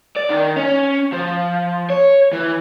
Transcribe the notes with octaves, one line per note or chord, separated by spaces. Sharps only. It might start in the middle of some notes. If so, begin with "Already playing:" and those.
D5
D#3
C#4
F3
C#5
E3